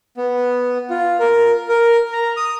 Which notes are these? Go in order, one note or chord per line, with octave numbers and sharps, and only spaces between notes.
B3
F4
A#4
A#4
A#5
D#6